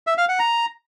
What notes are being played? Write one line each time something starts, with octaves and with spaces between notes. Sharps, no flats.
E5
F5
F#5
A#5